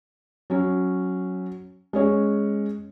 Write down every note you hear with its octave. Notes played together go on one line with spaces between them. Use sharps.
F#3 C#4
G#3 C#4 C#5